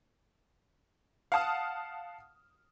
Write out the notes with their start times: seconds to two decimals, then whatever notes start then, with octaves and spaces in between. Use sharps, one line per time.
1.32 F5 F#5 A5 D#6 F6